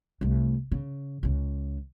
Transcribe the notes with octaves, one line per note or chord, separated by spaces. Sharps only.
C2 A3
C#3
C#2 C#3